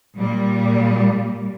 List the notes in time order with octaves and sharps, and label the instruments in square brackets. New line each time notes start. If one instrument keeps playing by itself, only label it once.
[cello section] A#2 G3